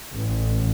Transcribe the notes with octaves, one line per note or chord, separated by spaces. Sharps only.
A1